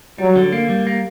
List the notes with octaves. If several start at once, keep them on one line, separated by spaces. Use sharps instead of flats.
F#3 G3
D3
A#3
G3
A#3